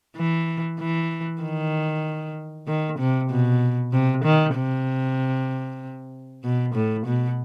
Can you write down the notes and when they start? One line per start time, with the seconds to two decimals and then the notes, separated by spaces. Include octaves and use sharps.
0.17 E3
0.79 E3
1.42 D#3
2.68 D#3
2.99 C3
3.30 B2
3.93 C3
4.24 D#3
4.56 C3
6.44 B2
6.75 A2
7.06 B2